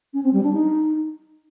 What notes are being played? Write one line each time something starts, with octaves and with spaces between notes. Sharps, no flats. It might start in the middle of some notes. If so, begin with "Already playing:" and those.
C#4
C4
G3
D4
D#4